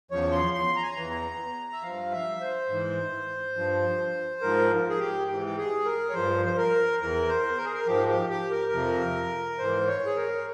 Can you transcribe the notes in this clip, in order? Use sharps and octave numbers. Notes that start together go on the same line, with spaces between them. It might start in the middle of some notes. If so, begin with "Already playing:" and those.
E2 C#3 F3 C#5
C6
C6
A#5
G#5
A#5
E2 E3
E5
G2 F3 F5
E5
C5
G#2 E3
G2 F3
G#2 F3 A#4
G#4
G4
G#2 E3 G4
G4
G#4
A#4
C#5
G2 F3 C5
C5
A#4
E2 E3 A#4
C5
A#4
G#4
A#4
G#2 F3 G4
G4
G4
A#4
F2 C3 F3
G#2 E3 C5
C#5
G#4
A#4